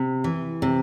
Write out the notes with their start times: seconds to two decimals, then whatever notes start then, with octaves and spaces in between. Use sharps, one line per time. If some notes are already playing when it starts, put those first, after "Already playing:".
Already playing: C3
0.24 E3
0.62 C3